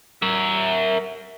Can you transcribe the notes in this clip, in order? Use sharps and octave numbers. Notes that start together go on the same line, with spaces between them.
A#4 E5